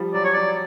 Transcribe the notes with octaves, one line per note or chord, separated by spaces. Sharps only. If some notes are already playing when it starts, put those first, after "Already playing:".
Already playing: F3 G3
F#3 D5
C#5
F#3 D5